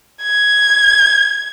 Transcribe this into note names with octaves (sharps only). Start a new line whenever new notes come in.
G#6